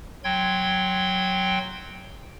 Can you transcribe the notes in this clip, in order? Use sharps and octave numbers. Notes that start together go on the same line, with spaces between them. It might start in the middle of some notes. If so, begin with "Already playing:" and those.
F#3 G5 C6 G#6